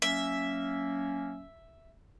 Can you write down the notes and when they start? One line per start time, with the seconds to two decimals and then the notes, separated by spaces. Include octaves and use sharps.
0.02 F#3 A#3 C#4 E5